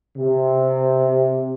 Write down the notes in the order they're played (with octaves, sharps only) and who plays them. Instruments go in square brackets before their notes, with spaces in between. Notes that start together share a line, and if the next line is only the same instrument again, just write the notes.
[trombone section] C3